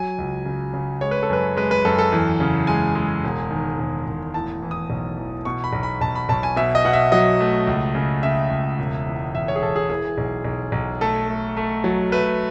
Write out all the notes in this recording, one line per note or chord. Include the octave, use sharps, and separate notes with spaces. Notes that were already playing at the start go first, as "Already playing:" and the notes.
Already playing: F#3 G#5
C#2
C#3
C#3
G#3 C#5
B4
A4
F#2 B4
G#3 B4
B4
F#2 A4
A4
E2
C#3
G#3 G#5
G#3
E1
D#3
E1
E1
A2 A5
E3
D#6
B1
E3
B2 C#6
B5
B1
B5
B1 A5
B5
B1 A5
G#5
B2 E5
D#5
B2 F#5
E5
F#3 D#5
A3
C#2
C#3
C#3 E5
C#2
E1
E2
E1 E5
C#5
G#4
E1 A4
G#4
E3 G#4
B1
B1
B1
A3 A4
A3
A3
F#3
A3 B4